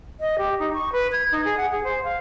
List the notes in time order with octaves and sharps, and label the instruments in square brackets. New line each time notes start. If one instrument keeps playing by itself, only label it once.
[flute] D#5
G4
D#4
C#6
B4
G#6
D#4
G#4
F#5
G#4
C5
F5